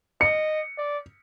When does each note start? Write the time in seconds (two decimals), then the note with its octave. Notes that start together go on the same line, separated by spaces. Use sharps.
0.21 D#5 C#7
0.78 D5